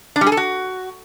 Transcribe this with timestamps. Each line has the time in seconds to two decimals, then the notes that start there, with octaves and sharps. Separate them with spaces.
0.16 D4
0.21 G3
0.27 G#4
0.32 A4
0.37 F#4